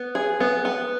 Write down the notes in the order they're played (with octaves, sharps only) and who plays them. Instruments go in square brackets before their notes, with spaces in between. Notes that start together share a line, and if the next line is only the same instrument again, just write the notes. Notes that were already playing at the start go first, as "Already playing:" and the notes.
Already playing: [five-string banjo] B3
G#4
B3
B3